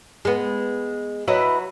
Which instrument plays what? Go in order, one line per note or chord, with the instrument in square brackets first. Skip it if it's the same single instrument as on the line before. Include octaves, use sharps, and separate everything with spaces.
[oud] G#3 B3
[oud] F#3 [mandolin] E4 B4 D#5